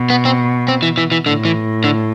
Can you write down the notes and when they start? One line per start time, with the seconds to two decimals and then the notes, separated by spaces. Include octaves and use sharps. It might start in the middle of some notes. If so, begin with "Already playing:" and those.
Already playing: B2
0.10 B3
0.25 C4
0.68 C4
0.83 E3
0.98 E3
1.12 E3
1.26 A2 D3
1.45 E3
1.84 D3